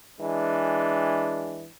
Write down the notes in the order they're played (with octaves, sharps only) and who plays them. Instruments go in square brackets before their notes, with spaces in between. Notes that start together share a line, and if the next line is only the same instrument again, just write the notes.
[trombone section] E3 G#3 D4